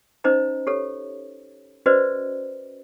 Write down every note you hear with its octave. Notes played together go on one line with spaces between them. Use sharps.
C#4 D#4 C5 D#5 A#5
G4 A4 C#5
C#4 F#4 B4 C5 D5 D#5